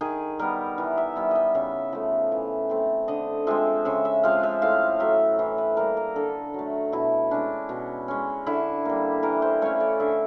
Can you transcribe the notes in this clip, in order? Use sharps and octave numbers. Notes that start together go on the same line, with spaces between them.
D#3 G#4
G3 B3 A#4
E3
E5
G3 B3 E5
D#5 E5
C#3 E5
F3 A3 E5
E3
A3 C4
D3 D#5
F3 G#3 C4 E5
C#3 E5
E5
F3 G#3 C4 F5
E5
A2 F5
F#3 A3 E5
E3
B4
G3 A#3 A#4
A#4
D3 A4
F#3 A3
B2 E4
G#3 C#4 D4
B2
G#3 C#4
D3 E4
G3 A#3
E3 A#4
C5
A3 C#4 C#5
D5
D3 E5